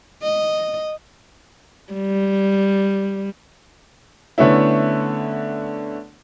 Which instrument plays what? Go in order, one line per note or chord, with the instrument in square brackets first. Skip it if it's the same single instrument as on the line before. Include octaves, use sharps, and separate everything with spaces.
[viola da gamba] D#5
G3
[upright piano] D3 A3 B3 C#4 E4